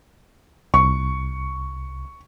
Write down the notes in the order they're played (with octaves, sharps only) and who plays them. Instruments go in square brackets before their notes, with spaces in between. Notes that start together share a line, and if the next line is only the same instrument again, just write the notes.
[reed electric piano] C2 [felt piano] C#6